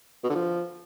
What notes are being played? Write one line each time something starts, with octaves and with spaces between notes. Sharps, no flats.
B2
D3
F3